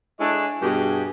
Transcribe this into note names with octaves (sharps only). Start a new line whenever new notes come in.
G#3 D4 E4 A4 C#5 D#5
G2 B2 G4 G#4